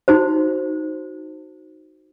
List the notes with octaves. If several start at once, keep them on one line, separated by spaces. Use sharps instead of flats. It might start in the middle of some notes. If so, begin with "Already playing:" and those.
D#4 F#4 C5